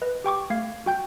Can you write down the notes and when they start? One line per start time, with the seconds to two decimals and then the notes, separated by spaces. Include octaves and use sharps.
0.02 B4 D#5
0.24 G4 G5 C#6 D6
0.50 A3 F5 G#6 C7
0.86 F#4 G5 G6